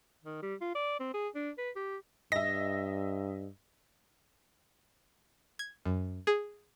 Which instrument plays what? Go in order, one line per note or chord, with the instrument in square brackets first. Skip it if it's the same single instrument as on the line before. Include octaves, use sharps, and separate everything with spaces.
[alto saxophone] D#3
G3
F4
D5
C4
G#4
D4
B4
G4
[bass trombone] G2 [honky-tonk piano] D#5 E5 [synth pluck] A#6
[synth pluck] G#6
F#2
G#4